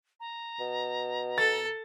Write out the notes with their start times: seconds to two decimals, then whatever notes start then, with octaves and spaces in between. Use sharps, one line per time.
0.20 A#5
0.60 B2
1.38 A4 A6